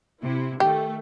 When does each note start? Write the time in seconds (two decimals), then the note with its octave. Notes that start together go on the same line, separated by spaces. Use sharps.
0.22 C3 E4
0.60 D#3 A3 G4